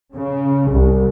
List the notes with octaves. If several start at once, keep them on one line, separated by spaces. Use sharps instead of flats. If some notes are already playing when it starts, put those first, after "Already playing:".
C#3
C2